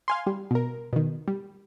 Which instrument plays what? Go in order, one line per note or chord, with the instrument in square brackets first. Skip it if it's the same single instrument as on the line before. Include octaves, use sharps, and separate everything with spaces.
[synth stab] F5 G#5 C6
G3
B2 A#4
B2 D#3
G3